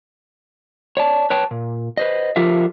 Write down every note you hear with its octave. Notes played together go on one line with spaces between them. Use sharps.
C#5 D5 A5
B4 C#5 G5 A5
A#2
B4 C5 D#5
F3 F4 G4 A4 A#4 E5